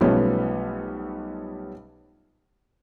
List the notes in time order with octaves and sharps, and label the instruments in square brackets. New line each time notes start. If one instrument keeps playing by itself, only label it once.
[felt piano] B1 F3 G3 A3 B3 C#4